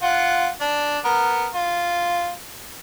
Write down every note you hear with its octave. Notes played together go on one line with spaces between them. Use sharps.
F4 F#5
D4
B3 A#4
F4